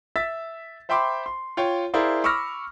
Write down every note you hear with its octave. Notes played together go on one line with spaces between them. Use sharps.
E5 E6 A6 B6
C5 E5 G5 B5 C6 D6
C6
F4 C#5 G5 C6
E4 G#4 A#4 C5 D5 F5
B5 C#6 D6 E6 F6 A#6